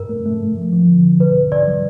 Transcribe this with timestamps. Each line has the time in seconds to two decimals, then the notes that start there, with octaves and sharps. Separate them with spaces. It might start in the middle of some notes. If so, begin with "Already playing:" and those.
Already playing: G2 A#4
0.09 A3
0.26 A3
0.41 G2
0.57 F3
0.72 F3
0.89 D3
1.04 D3
1.20 B2 B4
1.36 C#2
1.52 C#2 D5
1.67 F#3